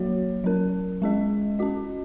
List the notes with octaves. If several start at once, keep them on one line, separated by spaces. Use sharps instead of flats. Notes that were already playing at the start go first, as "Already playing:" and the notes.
Already playing: F#3 A#3 F#4 C#5
F#3 C#4 A#4
G#3 C#4 G#4 D#5
C#4 F#4 D#5